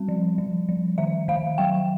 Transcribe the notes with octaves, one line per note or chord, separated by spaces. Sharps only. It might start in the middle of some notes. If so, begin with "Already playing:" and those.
Already playing: G3 C4
F3
F3
F3
D#3 E5
D#3 F5
F#3 G5